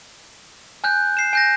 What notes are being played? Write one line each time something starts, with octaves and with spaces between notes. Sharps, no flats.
G#5 F#6 G6
C7 E7
G#5 G6 A#6